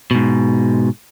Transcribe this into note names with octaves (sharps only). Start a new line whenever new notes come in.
G#2 B2